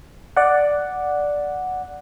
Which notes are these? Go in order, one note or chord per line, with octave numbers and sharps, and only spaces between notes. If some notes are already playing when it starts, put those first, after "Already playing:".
D5 F#5